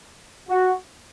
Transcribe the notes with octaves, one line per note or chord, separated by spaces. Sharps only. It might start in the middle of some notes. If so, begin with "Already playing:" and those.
F#4